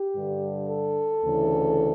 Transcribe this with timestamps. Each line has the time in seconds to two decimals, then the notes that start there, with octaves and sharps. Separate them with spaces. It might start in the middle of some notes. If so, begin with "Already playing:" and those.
Already playing: G4
0.15 G2 D3
0.69 A4
1.22 D2 C#3 E3